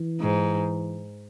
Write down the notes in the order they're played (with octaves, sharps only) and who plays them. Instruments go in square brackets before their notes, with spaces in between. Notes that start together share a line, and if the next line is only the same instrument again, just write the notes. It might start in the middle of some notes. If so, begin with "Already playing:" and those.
Already playing: [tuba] E3
[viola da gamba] G#2